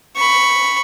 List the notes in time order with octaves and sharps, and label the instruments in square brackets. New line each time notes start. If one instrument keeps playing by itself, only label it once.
[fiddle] B5 C#6